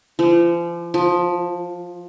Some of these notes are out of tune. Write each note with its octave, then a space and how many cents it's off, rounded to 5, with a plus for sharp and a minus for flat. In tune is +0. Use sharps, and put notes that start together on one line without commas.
F3 -35
F3 +15